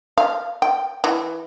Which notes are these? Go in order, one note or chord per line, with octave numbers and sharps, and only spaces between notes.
F5
G5
E3